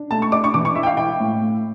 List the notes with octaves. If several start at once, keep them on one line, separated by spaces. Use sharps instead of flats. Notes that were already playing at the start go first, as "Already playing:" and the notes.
Already playing: D4
A3 A5
C#6
D4 D6
C#6
E3 D6
C#6
E4 E5
G5
F5
E4 G5
A2
A3